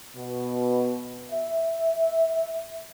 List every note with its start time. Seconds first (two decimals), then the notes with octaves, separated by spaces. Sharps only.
0.16 B2
1.32 E5